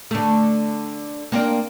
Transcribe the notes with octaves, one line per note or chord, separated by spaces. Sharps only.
D3 A3
A#3 C4 D4